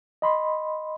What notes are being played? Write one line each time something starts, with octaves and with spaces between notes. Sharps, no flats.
D#5 B5 C6